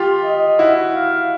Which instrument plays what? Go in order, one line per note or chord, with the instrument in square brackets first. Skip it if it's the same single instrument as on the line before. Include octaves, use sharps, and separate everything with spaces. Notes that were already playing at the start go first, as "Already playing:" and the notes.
Already playing: [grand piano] F4 G4
[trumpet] D#5
[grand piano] E4 F#4
[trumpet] F5